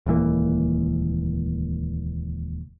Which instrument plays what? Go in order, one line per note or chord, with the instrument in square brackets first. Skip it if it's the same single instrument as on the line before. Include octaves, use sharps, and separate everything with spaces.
[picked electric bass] D#1 C#2 E3 A#3